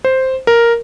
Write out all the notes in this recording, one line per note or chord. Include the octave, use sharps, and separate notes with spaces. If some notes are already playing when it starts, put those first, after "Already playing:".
C5
A#4